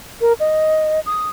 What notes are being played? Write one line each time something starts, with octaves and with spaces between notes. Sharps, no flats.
A#4
D#5
D#6